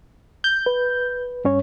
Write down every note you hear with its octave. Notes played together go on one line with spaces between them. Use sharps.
G6
B4
G2 C#4 C#5